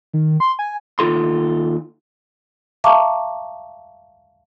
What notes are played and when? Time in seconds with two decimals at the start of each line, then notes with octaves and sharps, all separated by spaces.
0.14 D#3
0.40 C6
0.59 G#5
0.99 D#2 D#4 F4 A4 C6
2.84 E5 F5 A5 A#5 C#6 D6